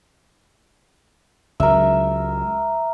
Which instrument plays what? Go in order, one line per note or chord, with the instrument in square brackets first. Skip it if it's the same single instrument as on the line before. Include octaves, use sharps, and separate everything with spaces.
[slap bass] C#2 F#3 [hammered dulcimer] A#4 E5